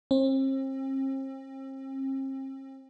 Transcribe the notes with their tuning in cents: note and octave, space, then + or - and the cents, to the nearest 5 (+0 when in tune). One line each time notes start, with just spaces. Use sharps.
C4 +40